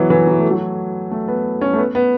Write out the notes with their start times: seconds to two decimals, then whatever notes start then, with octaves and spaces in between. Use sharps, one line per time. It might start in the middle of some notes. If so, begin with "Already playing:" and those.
Already playing: E3 F#3 B3
0.10 E3
0.27 F#3
0.39 A3
0.51 F#3
1.11 A3
1.28 B3
1.61 C#4
1.73 A3
1.78 B3
1.95 B3